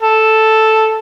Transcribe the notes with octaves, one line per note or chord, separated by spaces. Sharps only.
A4